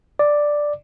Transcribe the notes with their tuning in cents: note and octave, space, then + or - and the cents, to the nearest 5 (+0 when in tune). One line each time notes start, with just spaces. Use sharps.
D5 +5